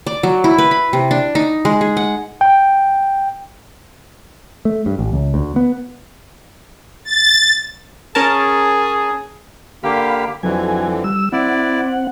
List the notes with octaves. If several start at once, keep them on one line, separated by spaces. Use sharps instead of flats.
D5
F#3
E4
B4
B5
C3
D4
D#4
G#3
G#4
F#5
G5
A3
G2
A1
C#2
D2
B3
A6
C#4 G#4 A#4 A5
D3 A#3 G4 F5 B5
F2 D3 E3 F#3 G#5
G3 E6
C4 E4 D5 F#5